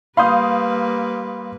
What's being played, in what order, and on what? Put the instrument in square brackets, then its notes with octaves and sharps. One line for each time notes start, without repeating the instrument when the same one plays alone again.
[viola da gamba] G3 A#3 B4 [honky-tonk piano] F5 D#6 [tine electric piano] B5 C6 G6